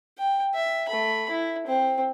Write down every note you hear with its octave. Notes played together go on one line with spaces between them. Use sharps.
G5
E5
A3 B5
E4
C4